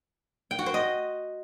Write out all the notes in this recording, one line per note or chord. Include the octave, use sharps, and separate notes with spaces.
G5
F#4
C5
D#5